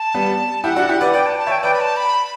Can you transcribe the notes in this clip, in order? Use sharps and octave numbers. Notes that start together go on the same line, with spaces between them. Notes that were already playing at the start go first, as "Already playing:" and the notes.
Already playing: A5
G3 B3
E4 G4 F#5
D4 F#4
E4 G4
B4 D5
B4 D5 G5
A5
A5
C#5 E5
G5
A5
B4 D5 G5
B5
A5
B5